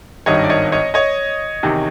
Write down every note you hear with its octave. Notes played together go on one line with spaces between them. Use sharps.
G#1 G2 D#3 C#5 D#5
D5
C#5 D#5
C#5 D#5
C#5 D#5
E2 C3 D#3